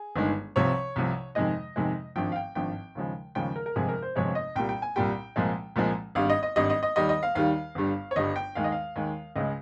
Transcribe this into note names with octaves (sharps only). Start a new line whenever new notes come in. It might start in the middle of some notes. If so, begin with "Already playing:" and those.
Already playing: G#4
G1 G2 D#3 G#3
C2 C3 F3 C#5
C2 C3 F3
F2 C3 D#3 G#3 D#5
F2 C3 D#3 G#3
G#1 G2 F3 G5
F5
G5
G#1 G2 F3 G5
D#2 C#3 F3 G#3
D#2 C#3 F3 G#3 G5
A#4
A#4
G1 F2 C3 F3 G#3 G#4
A#4
C5
G1 F2 C3 F3 G#3 C#5
D#5
C2 A#2 G3 G5
G5
G#5
C2 A#2 G3 G5
C2 A#2 F3 G#3
C2 A#2 F3 G#3
G#1 G2 G3 F5
D#5
D#5
G#1 G2 G3 D#5
D#5
D#5
D#2 D#3 G3 D#5
D#5
F5
D#2 D#3 G3 F5
G1 G2 G3
C#5
G1 G2 G3 D#5
G5
D#2 D#3 G#3 F5
D#5
F5
D#2 D#3 G#3
C#2 C#3 G#3 D#5